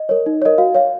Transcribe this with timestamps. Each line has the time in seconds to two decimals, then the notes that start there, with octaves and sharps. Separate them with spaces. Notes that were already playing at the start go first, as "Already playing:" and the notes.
Already playing: D#5
0.09 A#4 C#5
0.26 D#4
0.42 A#4 C#5 D#5
0.58 F#4 F5
0.75 C#5 F5